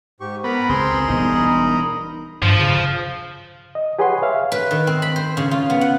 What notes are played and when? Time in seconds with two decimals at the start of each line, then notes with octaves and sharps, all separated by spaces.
0.20 G#2 G4 C#6
0.44 B3 A#4 A#5 B5
0.69 C#2 C4 G#4 C6
1.08 E1 B2 G3 D#4
2.42 G2 F3
2.59 C#3
3.75 D#5
3.99 G4 G#4 B4 C#5 F#5 C6
4.22 C#5 E5 F5
4.52 B4
4.71 D#3
4.87 C4
5.02 B5
5.16 C5
5.37 C#3
5.51 F4
5.70 B3
5.81 F#5